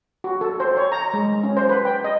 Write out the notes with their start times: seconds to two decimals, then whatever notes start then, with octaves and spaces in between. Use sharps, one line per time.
0.24 F#4
0.41 A4
0.60 C5
0.77 C#5
0.92 A#5
1.14 G#3
1.43 C#4
1.57 C5
1.69 B4
1.85 G5
2.04 D#5